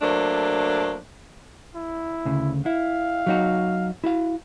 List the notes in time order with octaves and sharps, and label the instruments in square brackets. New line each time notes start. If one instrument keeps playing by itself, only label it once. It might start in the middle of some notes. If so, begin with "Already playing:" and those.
[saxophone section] F#3 A3 A#3 D4 C5
[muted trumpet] E4
[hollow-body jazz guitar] D2 C#3
[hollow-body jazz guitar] E4 [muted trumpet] F5
[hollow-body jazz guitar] F#3 D#4 F#4
E4 F#4 F5